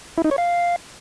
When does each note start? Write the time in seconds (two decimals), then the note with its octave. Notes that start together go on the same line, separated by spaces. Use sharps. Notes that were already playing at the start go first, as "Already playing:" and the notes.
0.18 E4
0.24 D#4
0.31 C#5
0.38 F5